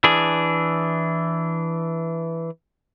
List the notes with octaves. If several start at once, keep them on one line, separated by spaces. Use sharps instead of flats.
E3 D4 G#4